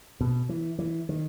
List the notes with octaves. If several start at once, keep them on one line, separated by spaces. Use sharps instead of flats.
B2
E3
E3
D#3